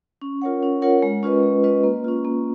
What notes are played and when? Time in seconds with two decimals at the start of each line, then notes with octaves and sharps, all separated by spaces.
0.21 C#4
0.42 F4 A#4 C#5 F#5
0.63 C#4
0.82 F4 A#4 C#5 F#5
1.02 G#3
1.23 C#4 F4 B4 D#5
1.43 G#3
1.63 C#4 F4 B4 D#5
1.84 A#3
2.04 C#4 F4
2.25 A#3